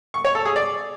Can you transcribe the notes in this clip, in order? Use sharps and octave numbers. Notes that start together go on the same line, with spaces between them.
C#6
C#5
A4
G#4
D5